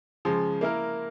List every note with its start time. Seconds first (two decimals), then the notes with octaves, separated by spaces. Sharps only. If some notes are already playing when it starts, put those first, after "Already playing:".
0.25 C#3 F3 G#3
0.61 A#3 E4 A#4